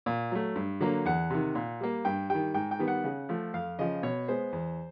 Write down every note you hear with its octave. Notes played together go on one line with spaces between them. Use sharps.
A#2
F#3 A3
G2
D3 F#3 A#3
E2 F#5
C3 D#3
A#2
G3 A#3
G2 G5
D#3 G3 G5
G#2 G5
G5
D#3 G3 B3
F#5
C#3
F3 A3
F2 F5
C#3 F3 D#5
B2 C#5
G#3 B3 C5
E2